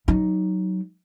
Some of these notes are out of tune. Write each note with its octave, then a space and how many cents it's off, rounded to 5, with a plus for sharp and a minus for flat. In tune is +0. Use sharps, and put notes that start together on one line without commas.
F#3 +10 D#4 +0